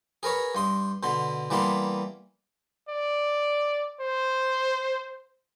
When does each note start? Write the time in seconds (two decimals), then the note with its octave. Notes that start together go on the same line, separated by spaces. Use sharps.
0.23 G#4 A#4 B4 C#5
0.55 G2 C6 D#6
1.03 B2 D3 C6
1.50 E3 G3 A#3 B3 A5 C6
2.89 D5
4.01 C5